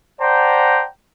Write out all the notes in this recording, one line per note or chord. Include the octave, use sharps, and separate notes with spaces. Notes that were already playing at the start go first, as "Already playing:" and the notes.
C5 D5 F#5 G5 A5 A#5